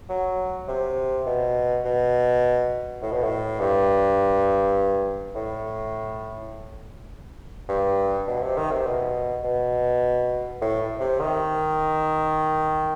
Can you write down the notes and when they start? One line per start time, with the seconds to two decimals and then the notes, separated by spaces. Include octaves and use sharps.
0.09 F#3
0.68 C3
1.26 B2
1.85 B2
3.02 A2
3.12 B2
3.22 A2
3.60 G2
5.35 A2
7.69 G2
8.27 B2
8.42 C3
8.57 D#3
8.71 C3
8.86 B2
9.44 B2
10.61 A2
11.00 C3
11.20 D#3